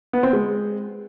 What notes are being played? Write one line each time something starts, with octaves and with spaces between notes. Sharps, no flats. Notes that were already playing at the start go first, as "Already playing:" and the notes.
B3
C4
G#3